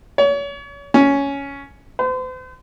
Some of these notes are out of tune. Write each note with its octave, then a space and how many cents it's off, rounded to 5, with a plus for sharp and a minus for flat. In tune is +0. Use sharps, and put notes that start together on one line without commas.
C#5 +35
C#4 +10
C5 -40